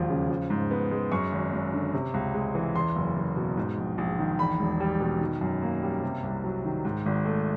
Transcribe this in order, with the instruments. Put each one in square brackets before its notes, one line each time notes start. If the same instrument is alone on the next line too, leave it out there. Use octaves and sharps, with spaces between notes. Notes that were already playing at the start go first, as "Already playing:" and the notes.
Already playing: [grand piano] E1 D#2 F3
C#3
F3
G#2
B3
G#3
F#2 C#6
G#1
G#1
D3
C3
C#2
G#3
E3
E2 C6
F#1
F#1
B2
G#2
A#1
A#1
D#3
E2 B5
E1
G3
B2
D#3
F#2
A#3
G3
C3
C2
F#3
D#3
G#2
G#1
A3